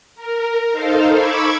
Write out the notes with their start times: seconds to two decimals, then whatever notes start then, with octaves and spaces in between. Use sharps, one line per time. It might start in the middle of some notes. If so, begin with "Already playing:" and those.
0.15 A#4
0.72 D#4 A4 C5 F5
1.12 B5 C#6 D6 E6 G#6